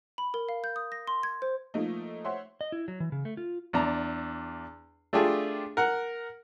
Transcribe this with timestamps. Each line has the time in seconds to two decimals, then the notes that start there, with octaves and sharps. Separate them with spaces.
0.18 B5
0.34 A#4
0.49 F5
0.64 G6
0.76 D#6
0.92 A#6
1.07 C6
1.23 G#6
1.42 C5
1.74 F3 A3 A#3 D#4
2.25 C5 C#5 E5 F#5 C6
2.61 D#5
2.72 E4
2.88 F#3
3.00 E3
3.12 C#3
3.25 A3
3.37 F4
3.73 E2 D4 A#5
5.13 A3 D4 F4 G4 G#4
5.77 A#4 F#5